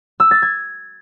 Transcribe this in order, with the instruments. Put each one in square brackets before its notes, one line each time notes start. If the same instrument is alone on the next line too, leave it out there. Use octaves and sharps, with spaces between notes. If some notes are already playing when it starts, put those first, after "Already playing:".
[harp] E6
A6
G#6